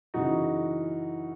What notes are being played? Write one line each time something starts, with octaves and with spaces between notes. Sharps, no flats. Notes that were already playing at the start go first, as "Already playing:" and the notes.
F#2 C#3 E3 D#4 F#4